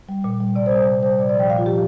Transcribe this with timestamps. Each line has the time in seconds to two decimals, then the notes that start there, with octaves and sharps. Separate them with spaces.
0.09 G3
0.24 A#2
0.40 G3
0.55 C3 D5
0.66 C5
0.71 G3
0.77 C5
0.87 C3
1.03 G3 C5
1.19 A#2 D5
1.29 D5
1.35 F3 G5
1.50 A#2 F5
1.58 F4
1.66 F3 G4